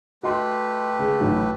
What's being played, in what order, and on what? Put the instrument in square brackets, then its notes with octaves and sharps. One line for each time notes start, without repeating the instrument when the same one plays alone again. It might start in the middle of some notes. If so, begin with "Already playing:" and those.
[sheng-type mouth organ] A3 G4 B4 [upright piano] F#4 D#5 C6
[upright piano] C#3 G#3
A1 A2 F#3